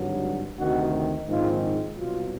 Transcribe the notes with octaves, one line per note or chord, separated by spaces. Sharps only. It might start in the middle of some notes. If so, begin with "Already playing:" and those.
Already playing: G#1 G2 D3 F#3
D2 C3 D#3 F#4
A#1 G#2 D#3 G#3 C4 F4
C2 B2 F#3 F4